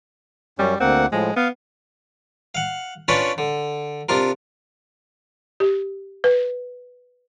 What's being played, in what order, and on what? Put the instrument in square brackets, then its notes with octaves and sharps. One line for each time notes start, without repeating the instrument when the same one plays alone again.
[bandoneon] F#2 C#4 [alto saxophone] G3
[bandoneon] D2 A#3 F#5 [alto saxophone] C4
[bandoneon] A2 F3 [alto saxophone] G#3
[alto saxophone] B3 [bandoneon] F5
[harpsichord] F5 F#5
C#4 D4 F4 B4 C#5 D5
D3
C3 D4 F4 A#4
[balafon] G4
B4